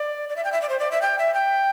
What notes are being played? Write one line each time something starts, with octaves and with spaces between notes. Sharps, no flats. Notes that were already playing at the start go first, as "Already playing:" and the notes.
Already playing: D5
D5
E5
G5
E5
D5
C5
D5
E5
G5
E5
G5